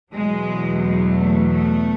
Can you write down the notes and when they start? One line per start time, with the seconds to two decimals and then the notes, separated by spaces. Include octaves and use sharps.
0.11 E2 B2 F#3 G#3
0.81 G#3
1.15 A3
1.50 A3